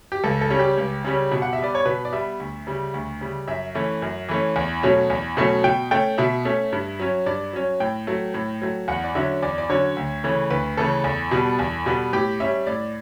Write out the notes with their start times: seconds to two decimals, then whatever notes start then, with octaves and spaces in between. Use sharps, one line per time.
0.12 G4
0.24 C#2 A4
0.41 A4
0.50 C#3 G3 C#4
0.59 G4
0.78 C#2
1.04 C#3 G3 C#4
1.32 B2
1.42 F#5
1.53 E5
1.59 G3 B3 D5
1.75 C#5
1.85 B2 B4
2.05 D5
2.13 G3 B3 E5
2.40 D2
2.67 C#3 G3
2.94 D2
3.21 C#3 G3
3.48 F#2 E5
3.75 E3 A3 C#4
4.02 F#2
4.29 E3 A3 C#4
4.56 E2
4.83 B2 F#3 A3 C#4
5.10 E2
5.37 B2 F#3 A3 C#4
5.64 B2 G5
5.91 A3 C#4 G5
6.18 B2 E5
6.45 A3 C#4
6.72 G2
6.99 F#3 C#4
7.26 G2 D5
7.53 F#3 C#4
7.80 A2 G5
8.07 F#3 A3
8.34 A2
8.62 F#3 A3
8.88 E2 F#5
9.04 D5
9.15 D3 F#3 C#4 E5
9.42 E2 D5
9.58 D5
9.69 D3 F#3 C#4 C#5
9.97 D2
10.24 C#3 E3 A3 C#4
10.50 D2 B4
10.77 C#3 E3 A3 C#4 A4
11.04 E2
11.31 B2 G3 B3
11.59 E2
11.86 B2 G3 B3
12.13 A2 G4
12.40 G3 C#4 E5
12.66 A2 D5